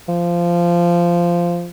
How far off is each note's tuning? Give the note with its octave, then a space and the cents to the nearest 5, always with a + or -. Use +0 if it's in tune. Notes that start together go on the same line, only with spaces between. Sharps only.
F3 -15